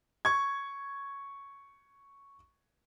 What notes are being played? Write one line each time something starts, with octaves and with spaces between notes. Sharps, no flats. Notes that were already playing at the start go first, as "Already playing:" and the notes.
C#6 G#6